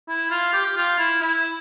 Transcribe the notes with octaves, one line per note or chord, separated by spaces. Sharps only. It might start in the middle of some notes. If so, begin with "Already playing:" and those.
E4
F4
G4
G4
F4
E4
E4